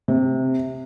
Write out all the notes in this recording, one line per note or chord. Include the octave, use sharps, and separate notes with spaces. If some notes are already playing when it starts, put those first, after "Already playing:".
C3